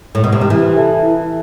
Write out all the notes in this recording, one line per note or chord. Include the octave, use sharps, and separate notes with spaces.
A2
B2
C3
D#3
E3 E4
A4 E5 A5
E4